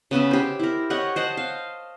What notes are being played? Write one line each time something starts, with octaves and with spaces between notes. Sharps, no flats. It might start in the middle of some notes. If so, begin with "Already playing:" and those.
C#3 B3 G#4 E5
G4 C5
E4 A#4
G4 C#5 D#5 F#5
C5 D#5 F#5 A5
F5